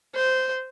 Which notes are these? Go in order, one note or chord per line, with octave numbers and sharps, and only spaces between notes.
C5